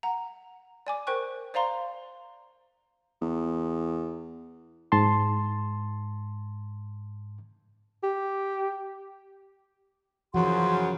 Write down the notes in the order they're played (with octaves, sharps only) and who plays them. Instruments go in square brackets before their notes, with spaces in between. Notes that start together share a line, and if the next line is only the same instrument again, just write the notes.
[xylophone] F#5 A#5
D5 G#5 D6
A#4 C5 G5 C#6 F#6
C5 D5 F5 A#5 C6
[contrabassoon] E2
[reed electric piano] G#2 A5 C6
[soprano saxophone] G4
[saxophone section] F#2 C#3 [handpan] E3 F3 [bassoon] F#4 [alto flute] C6